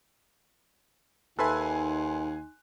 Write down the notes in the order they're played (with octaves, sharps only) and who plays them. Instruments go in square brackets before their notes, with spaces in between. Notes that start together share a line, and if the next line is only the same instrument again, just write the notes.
[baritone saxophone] D#2 [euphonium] D#4 [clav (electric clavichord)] A4 B4 E5 [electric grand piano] G#5 C6 F#6